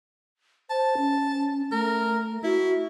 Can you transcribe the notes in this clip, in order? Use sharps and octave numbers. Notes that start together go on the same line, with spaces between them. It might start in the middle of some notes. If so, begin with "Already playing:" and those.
C5 A5
C#4
A3 A#4
E4 F#4